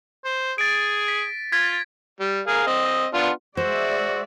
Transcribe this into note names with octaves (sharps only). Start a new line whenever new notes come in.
C5
G#4 A6 D7
B6
F4 G#6 B6
G3
G#4 A#4 F5
C4 D#5
B3 D4 F4
G#3 F#4 C5 D5 E5